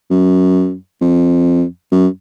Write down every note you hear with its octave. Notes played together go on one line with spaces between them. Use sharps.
F#2
F2
F#2